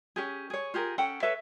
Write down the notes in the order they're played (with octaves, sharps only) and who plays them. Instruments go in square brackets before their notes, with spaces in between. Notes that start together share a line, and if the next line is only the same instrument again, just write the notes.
[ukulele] C#4 G4 G#4
G#4 C#5
F4 G4 G#4 A#4
C#4 A4 F#5 G5
A4 B4 C#5 E5